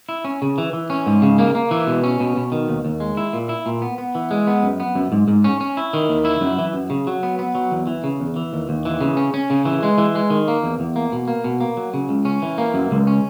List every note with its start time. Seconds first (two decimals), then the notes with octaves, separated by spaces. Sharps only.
0.09 E4
0.25 C#4
0.42 C#3
0.58 E3
0.73 E3
0.90 C#4
1.06 G#2
1.22 C#3
1.38 A#3
1.55 A#3
1.71 E3
1.87 B2
2.04 C#4
2.20 B2
2.36 B2
2.52 D#3
2.69 D#2
2.85 D#2
3.00 G#3
3.17 E4
3.33 A#2
3.49 E4
3.66 A#2
3.82 B3
3.98 B3
4.15 E3
4.31 G#3
4.47 B3
4.63 F#2
4.80 B3
4.95 F#2
5.12 G#2
5.28 G#2
5.44 C#4
5.61 C#4
5.77 E4
5.93 D#3
6.09 D#2
6.25 E4
6.41 F#2
6.58 E3
6.73 F#2
6.90 C#3
7.07 F#3
7.23 B3
7.39 B3
7.55 F#3
7.72 E2
7.87 E3
8.04 C#3
8.20 E2
8.36 E3
8.53 D#2
8.69 D#2
8.85 E3
9.01 C#3
9.17 C#4
9.34 C#4
9.50 C#3
9.65 E3
9.83 G#3
9.98 E3
10.15 G#3
10.30 D#3
10.48 A#3
10.63 E2
10.80 E2
10.96 A#3
11.12 B2
11.28 A#3
11.44 B2
11.60 A#3
11.77 F#3
11.94 C#3
12.09 C#2
12.25 C#4
12.42 E3
12.58 A#3
12.74 F#2
12.91 C#2
13.07 C#4